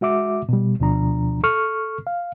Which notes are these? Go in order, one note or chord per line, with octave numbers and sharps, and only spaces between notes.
G#3 F#4 E5 D6
B2 G3
D2 B2 F3 D4 A#5
A4 C#6 F6
F5